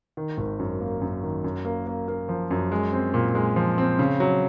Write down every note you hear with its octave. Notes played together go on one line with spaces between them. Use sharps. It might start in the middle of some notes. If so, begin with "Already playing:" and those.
D#3
G#1
F#2
A#3
F#2
D#3
F#2
A#3
A#3
A#3
F3
F#2
G#3
C4
A#2
G#3
F3
C4
C#3
F#3